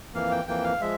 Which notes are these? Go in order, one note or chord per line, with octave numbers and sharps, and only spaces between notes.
F2 E3 A#3 F5
G5
F2 E3 A#3 G5
F5
F3 G#3 E5